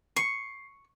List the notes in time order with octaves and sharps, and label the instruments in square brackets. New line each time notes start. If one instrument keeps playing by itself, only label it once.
[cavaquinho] C#6 [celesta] C7